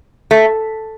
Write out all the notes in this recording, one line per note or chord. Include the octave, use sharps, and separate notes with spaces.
A3